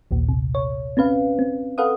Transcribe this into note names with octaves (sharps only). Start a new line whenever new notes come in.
A#1 D#2 A#2
C3
C#5
C4 C#4 B4 F5
C4
A4 B4 F5 F#5 D#6